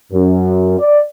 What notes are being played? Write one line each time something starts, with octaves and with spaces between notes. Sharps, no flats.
F#2
D5